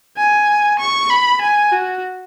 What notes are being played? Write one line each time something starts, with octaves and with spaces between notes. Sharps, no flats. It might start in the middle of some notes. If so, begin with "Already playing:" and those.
G#5
C#6
B5
G#5
F#4